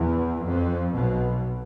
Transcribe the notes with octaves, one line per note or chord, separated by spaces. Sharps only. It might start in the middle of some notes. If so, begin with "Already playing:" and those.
Already playing: E2
F2
B1 B2